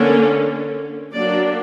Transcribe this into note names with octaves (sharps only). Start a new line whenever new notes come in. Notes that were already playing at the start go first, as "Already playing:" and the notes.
Already playing: D3 A#3 C#4
F#3 A#3 D4 D5